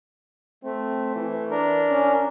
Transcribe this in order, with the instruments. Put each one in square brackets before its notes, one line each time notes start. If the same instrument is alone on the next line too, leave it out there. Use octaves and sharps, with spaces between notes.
[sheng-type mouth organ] A3 [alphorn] C4
[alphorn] E3
[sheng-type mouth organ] D4 A#4
[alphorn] C#4